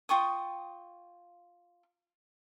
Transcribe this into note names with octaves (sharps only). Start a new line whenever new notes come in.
F4 G5 C#6 D#6